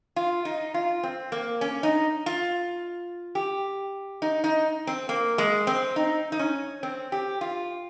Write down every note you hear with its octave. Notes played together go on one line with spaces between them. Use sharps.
F4
D#4
F4
C4
A#3
C#4
D#4
F4
G4
D#4
D#4
C4
A#3
G#3
C4
D#4
D#4
C#4
C4
G4
F4